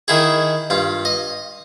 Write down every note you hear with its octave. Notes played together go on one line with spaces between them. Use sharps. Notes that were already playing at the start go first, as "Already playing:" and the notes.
D#3 E4 G#4
G2 F4
D#5